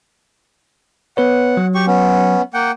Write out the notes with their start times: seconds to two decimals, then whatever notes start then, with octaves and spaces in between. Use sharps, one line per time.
1.17 B3 B4 C#5 F#5
1.57 F#3
1.75 G4 C#6
1.87 B3 C#4
2.54 A#3 F#5 G5